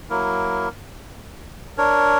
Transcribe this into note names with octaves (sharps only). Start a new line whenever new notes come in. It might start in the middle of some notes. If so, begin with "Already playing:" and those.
F#3 A#3 E4 A#4
D4 A#4 C#5